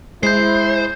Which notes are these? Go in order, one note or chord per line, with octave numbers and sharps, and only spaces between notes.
G#3 E4 C5 G6 C7